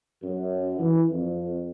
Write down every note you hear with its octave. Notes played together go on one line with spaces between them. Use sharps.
F#2
E3
F2